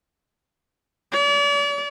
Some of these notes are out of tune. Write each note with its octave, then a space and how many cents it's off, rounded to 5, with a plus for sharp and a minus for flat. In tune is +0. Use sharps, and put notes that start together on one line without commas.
D5 -40